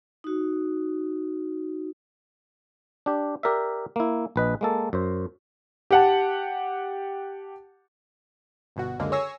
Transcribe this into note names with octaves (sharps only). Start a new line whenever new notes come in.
D#4 F#4
D4 G4
G4 A#4 D5 E5
A#3 E4
A#1 B4 D#5
G#3 A#3 A4
F#2 C5
G4 F#5 A5
G1 B2 F#4
C#2 F#2 D3 G#3 A#3
C#5 G#5 C#6 E6 A#6 C7